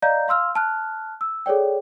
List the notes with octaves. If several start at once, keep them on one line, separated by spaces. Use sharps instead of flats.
D5 D#5 F5 A#5 G6
F5 C6 E6 F6
A5 F6 F#6
E6
G#4 A4 C#5 D5 G5